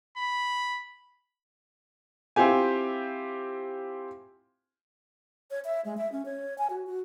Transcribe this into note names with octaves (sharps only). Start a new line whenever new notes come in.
B5
C4 E4 F4 G4 G#5
C#5
E5
G#3
E5
C#4
C#5
G#5
F#4
F#4